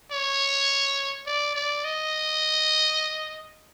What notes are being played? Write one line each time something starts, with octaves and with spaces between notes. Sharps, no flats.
C#5
D5
D5
D#5